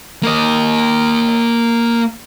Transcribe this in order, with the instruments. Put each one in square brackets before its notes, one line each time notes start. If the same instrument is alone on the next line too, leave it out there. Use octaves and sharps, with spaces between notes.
[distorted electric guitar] A#3 D#5